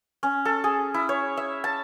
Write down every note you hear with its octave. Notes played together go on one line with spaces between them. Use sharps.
C#4
A4
G#4
E4
C#5
E5
A5